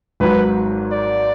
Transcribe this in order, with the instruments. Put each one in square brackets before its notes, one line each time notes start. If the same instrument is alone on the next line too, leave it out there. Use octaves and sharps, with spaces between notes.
[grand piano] G#1 G#2 F#3 [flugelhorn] B4
[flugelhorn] D5